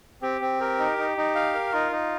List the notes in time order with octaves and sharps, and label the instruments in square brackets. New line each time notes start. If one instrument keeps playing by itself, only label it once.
[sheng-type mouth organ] C4 [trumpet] G4
[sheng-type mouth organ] C4
[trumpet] G4 [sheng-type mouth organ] A#4
[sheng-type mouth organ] D#4
D#4
D#4
F5
A#4
[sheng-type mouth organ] D#4 [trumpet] F4
[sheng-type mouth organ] D#4